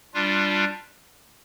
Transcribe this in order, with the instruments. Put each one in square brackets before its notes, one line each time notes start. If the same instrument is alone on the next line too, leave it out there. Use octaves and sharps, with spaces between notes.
[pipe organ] G3 D4 F4